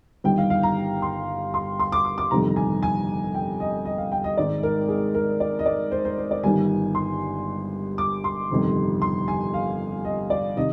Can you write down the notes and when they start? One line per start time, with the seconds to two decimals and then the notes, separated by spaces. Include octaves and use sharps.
0.24 G1 G2 D#3 G5
0.38 F5
0.50 F5
0.63 A#5
1.02 C6
1.54 C6
1.79 C6
1.92 D6
2.05 D6
2.18 D6
2.31 G1 F2 C3 D#3 A#5
2.56 G#5
2.83 G#5
3.34 G5
3.60 D#5
3.85 D#5
3.98 F5
4.12 G5
4.24 D#5
4.37 G#1 G#2 D#3 D5
4.63 A#4
4.89 G#4
5.15 A#4
5.40 D5
5.59 D#5
5.66 D5
5.92 C5
6.05 C5
6.18 C5
6.31 D5
6.44 G1 G2 D#3 G#5
6.95 C6
7.98 D6
8.24 C6
8.50 G1 F2 C3 D#3
9.02 C6
9.28 G#5
9.54 F5
10.05 D#5
10.30 D5
10.56 C3 D#3 D#5